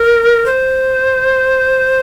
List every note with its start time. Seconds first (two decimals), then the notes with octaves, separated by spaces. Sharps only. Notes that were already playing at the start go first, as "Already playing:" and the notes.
Already playing: A#4
0.46 C5